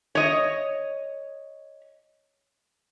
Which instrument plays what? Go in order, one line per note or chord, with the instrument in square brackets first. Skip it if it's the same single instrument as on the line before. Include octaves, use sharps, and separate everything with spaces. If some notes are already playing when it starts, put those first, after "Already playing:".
[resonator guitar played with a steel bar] C#5 D#5